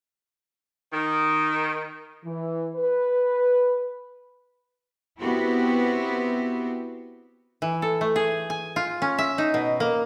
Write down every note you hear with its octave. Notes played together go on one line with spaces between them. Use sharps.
D#3
E3
B4
B3 C4 E4 F#4 G4
E3
A4
A3
G#4
G#5
F4
C#4
E5
D#4
B2
A#3